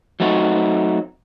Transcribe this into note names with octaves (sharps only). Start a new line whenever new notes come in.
F#3 A3 C4 D#4 F#4